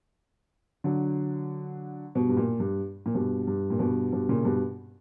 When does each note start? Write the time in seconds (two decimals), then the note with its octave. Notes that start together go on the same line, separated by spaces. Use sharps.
0.84 D3 F#3
2.15 G2 B2
2.29 G2
2.37 A#2
2.60 G2
3.06 A#2
3.15 G2 B2
3.47 G2
3.70 A#2
3.79 G2 B2
4.12 G2 B2
4.29 A#2 C#3
4.45 G2 B2